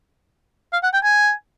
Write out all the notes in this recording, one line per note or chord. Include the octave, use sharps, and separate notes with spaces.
F5
F#5
G5
G#5